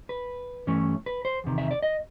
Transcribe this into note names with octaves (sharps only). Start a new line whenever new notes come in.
B4
G2 E3 A3 C#4
B4
C5
E2 C3 D#3
E5
D5
D#5